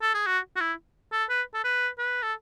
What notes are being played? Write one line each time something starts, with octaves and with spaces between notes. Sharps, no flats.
A4
G#4
F#4
F#4
E4
A4
B4
A4
B4
B4
A4